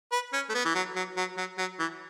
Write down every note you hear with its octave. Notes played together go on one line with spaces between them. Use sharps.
B4
C#4
A3
B3
E3
F#3
F#3
F#3
F#3
F#3
E3